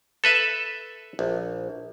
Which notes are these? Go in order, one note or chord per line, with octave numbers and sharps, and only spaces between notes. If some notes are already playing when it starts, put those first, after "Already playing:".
A4 B4 E5
A#1